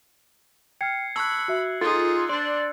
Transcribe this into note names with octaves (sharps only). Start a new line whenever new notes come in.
G5 F6 G#6 C7 C#7
A5 B5 C#6 E6 F#6
F#4 E5
D#4 F4 G#4 A4
D4 C5 D5 C6